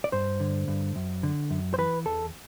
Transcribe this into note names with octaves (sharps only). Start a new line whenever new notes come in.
D5
G2 C5
D3
G2
F#2
D3
F#2
C5
E3 B4
E2 A4